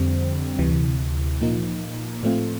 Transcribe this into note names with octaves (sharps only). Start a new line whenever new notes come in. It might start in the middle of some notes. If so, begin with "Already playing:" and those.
Already playing: F2 D3 G3 C4
D2 C3 E3
A#2 F3 A#3 D#4
A2 F3 A3 C4 F4